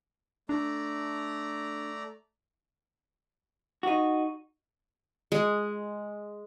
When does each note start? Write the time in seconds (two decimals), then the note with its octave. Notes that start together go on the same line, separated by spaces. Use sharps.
0.49 A3 D4 D5 A#5
3.83 D#4 F#4
5.32 G#3